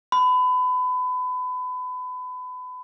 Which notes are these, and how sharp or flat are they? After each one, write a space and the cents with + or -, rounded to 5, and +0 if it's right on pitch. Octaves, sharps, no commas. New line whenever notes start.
B5 +30